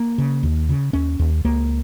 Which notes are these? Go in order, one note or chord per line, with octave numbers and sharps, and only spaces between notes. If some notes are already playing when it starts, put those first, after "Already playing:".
Already playing: A#3
C#3
D#2
C#3
D#2 C#4
D#2
C#2 A#3